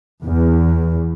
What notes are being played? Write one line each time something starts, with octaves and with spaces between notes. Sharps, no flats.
E2